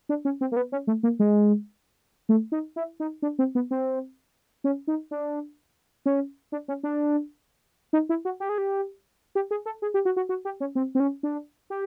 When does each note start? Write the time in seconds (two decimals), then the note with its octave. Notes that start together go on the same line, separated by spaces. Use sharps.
0.09 D4
0.25 C#4
0.41 C4
0.52 A#3
0.56 B3
0.72 C#4
0.87 A3
1.03 A#3
1.19 G#3
2.29 A3
2.52 D#4
2.76 E4
3.00 D#4
3.22 D4
3.39 C4
3.55 B3
3.71 C4
4.64 C#4
4.87 D#4
5.11 D4
6.06 C#4
6.52 D4
6.68 C#4
6.83 D4
7.93 D#4
8.09 E4
8.25 F#4
8.40 G4
8.49 G#4
8.58 G4
9.35 G4
9.51 G#4
9.66 A4
9.82 G#4
9.94 G4
10.05 F#4
10.17 F#4
10.29 F#4
10.45 G4
10.60 C#4
10.75 C4
10.95 C4
11.00 C#4
11.23 D4
11.70 G4